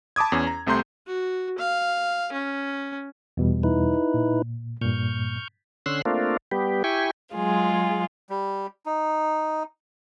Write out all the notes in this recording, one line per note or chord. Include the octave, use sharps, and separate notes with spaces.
A5 B5 D6 D#6 G#6
E2 C#4
A#5
C2 C3 A3 A#5 C6 G6
F#4
F5
C#4
E2 B2 G3
D#4 E4 B4
A#2
G2 A#2 C#6 F6 G6
D3 C#4 C6 E6 F#6
A3 A#3 C4 D4 F4
G3 B3 G4
E4 G4 G5 G#5 C#6
F#3 G#3 F4 G#4
G3
D#4